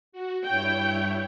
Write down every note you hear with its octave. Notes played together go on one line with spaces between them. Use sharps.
F#4
G2 E4 C#5 G5